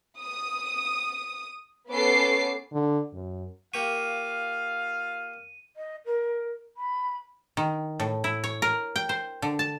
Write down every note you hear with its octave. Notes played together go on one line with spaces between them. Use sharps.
D#6
B3 C#4 A4 D6 C7
D3
F#2
A#3 F4 G4 F5 C#6 D#7
D#5
A#4
B5
D#3
A2
E4
C#5
A#4
G5
C5
D3
A5